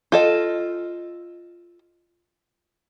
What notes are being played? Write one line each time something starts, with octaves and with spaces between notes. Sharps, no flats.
F4 A4 D#5